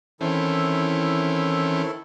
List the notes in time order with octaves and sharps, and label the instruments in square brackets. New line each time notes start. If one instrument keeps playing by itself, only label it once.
[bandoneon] D#3 E4 A4 [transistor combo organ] E3 C4 C#4